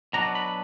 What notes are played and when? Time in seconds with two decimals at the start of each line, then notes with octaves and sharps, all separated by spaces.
0.13 B2 F#3 B3 D4 A#5
0.35 B5